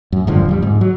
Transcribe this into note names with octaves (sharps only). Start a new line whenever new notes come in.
F#2
D1 G2 D3 F3
F2 G3
G#2
F#3